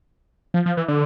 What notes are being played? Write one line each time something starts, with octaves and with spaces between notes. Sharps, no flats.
F3
F3
E3
D3